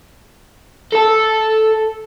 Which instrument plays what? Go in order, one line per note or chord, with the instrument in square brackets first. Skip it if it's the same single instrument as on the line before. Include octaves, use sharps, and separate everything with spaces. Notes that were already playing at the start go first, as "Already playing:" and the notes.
[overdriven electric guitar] A4 A5